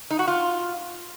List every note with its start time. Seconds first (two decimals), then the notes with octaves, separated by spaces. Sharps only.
0.11 D#4
0.19 F#4
0.27 F4